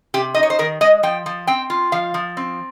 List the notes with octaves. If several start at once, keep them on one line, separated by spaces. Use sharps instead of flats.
C3 G4
D#4 D#5
C#5
C5
D#3 A#4
G#3 D#5
F3 G5
F3
C4 G5
F4
F3 F5
F3
C4